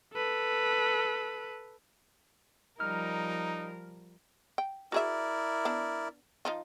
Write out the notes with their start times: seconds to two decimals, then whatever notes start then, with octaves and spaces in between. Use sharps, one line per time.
0.14 A4 B4
2.80 F3 G3 D#4 A#4 F6
4.58 G5
4.92 E4 F#4 G#4 A#4 D5 E5
5.65 B3 D4
6.45 F3 D#4 F4